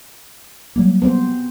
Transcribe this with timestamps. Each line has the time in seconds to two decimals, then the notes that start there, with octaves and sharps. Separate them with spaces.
0.76 F#3 G3 A#3
1.02 B3 C4 C5